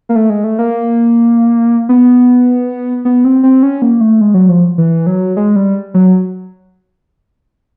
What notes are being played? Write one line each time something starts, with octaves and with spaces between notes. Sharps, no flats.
A#3
A3
G#3
A3
A#3
B3
B3
C4
C4
C#4
A#3
A3
G#3
F#3
F3
E3
F#3
G#3
G3
F#3